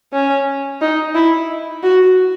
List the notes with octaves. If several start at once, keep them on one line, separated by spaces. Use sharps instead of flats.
C#4
D#4
E4
F#4